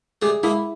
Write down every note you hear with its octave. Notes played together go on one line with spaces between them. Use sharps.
G3 A3 G#4
G#3 A#3 E4